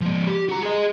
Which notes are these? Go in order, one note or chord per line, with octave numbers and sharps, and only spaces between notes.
F3 G#3
G4
F#4 A#5
G#4 D#5